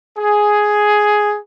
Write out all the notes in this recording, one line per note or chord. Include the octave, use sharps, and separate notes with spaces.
G#4